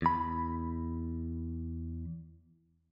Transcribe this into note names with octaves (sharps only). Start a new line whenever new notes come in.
E2 B5